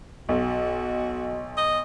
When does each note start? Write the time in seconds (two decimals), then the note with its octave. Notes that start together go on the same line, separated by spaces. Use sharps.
0.29 B1 F#4
1.57 D#5